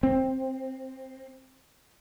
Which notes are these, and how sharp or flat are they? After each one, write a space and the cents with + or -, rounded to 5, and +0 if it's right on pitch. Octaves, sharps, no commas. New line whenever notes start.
C4 +10